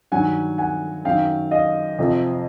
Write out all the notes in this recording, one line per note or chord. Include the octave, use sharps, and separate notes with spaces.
G2 D#3 F#3 F#5 G#5
F#5 G#5
F#2 D#3 F#3 F5 G5
D#5 F5
F2 C3 F3